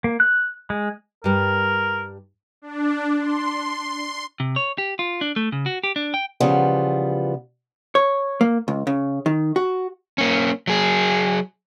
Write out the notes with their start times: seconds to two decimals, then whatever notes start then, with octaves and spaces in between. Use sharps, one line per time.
0.04 A#3
0.20 F#6
0.70 G#3
1.24 G2 G3 A#4
2.62 D4
3.19 C6
4.40 C3
4.56 C#5
4.78 G4
4.99 F4
5.21 D4
5.36 A3
5.52 C#3
5.66 F#4
5.84 G4
5.96 D4
6.14 G5
6.40 C#3 E3 F3 G3 B3
7.95 C#5
8.41 A#3
8.68 C#2
8.87 C#3
9.26 D#3
9.56 F#4
10.18 A#3 C#4
10.67 F#3 G#4